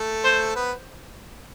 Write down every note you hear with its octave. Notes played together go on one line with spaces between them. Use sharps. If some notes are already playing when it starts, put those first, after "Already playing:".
Already playing: A3 A4
C5
B3 B4